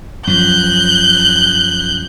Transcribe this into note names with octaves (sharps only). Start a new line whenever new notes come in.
F#2 F3 F#6 G6